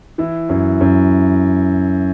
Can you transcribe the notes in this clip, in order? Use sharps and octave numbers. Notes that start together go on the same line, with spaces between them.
E3 E4
F#2
F#2